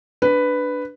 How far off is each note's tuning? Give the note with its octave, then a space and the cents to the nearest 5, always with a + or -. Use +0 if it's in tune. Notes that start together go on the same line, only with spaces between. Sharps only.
D4 +0 B4 +5